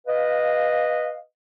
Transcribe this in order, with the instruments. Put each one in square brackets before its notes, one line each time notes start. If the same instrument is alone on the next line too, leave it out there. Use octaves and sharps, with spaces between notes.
[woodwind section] B4 D#5 F5